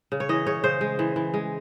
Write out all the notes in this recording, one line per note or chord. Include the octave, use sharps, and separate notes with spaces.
C#3
C#5
E3 D#5
C#3 C#5
C#3 C5
G#3
E3
E3
G#3